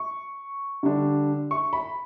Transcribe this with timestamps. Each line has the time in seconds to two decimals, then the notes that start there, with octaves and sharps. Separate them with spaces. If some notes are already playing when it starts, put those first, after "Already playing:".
Already playing: C#6
0.83 D3 G3 D4
1.51 C#6
1.73 B5